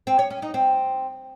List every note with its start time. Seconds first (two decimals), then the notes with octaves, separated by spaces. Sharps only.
0.07 C4
0.19 C#5
0.30 C#4
0.42 D#4
0.54 C4